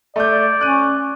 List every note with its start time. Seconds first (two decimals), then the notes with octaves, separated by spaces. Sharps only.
0.16 A3 D5 G6
0.61 C#4 F#6 D#7